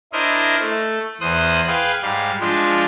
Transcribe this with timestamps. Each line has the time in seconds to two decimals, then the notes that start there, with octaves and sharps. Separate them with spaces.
0.13 D4 E4 A#4 C5 D#5
0.60 A3
1.21 E2 C5 D#6 F#6
1.68 G#4 B4 F5 G5
2.02 G#2 G3 F5
2.40 F3 G#3 D4 F4